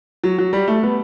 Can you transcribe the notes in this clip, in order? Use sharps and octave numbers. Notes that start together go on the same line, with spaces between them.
F#3
F#3
G3
A3
B3